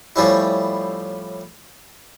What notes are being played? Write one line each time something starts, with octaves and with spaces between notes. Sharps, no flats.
A2 F3 G3 C#4 E4